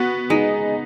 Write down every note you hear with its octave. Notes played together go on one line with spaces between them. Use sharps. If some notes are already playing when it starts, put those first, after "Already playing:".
Already playing: B3 F#4
G#3 D#4